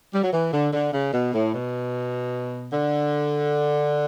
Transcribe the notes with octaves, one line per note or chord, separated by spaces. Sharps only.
G3
F#3
E3
D3
D3
C#3
B2
A2
B2
D3